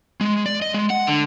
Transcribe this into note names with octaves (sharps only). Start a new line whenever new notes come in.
G#3
D5
D#5
G#3
F#5
D3